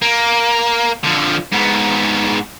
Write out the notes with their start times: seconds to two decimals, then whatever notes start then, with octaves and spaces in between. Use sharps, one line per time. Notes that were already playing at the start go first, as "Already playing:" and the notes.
0.02 A#3
1.04 D3 F3
1.52 G#2 B3